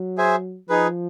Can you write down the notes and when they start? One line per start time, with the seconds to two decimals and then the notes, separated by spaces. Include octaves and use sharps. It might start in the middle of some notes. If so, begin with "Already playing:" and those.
Already playing: F#3
0.18 G#4 C5 E5 G#5
0.69 F3 D#4 G#4 B4